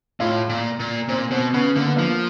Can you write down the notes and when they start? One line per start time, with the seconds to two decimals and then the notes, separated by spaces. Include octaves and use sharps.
0.20 A2 F4
0.49 A#2
0.80 A#2
1.09 A#2 C4
1.31 B2 C4
1.54 C#3 B3
1.76 D3 A#3
1.87 B3
1.97 F3 A#3